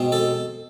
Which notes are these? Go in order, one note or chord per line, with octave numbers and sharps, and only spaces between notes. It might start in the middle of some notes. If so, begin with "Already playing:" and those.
Already playing: B2 G#3 C4
A4